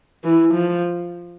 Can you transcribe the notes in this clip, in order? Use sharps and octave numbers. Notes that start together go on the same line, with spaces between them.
E3
F3